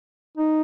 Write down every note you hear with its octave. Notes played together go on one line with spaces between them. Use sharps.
D#4